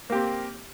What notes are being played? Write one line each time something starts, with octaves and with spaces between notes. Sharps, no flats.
A#3 C4 G4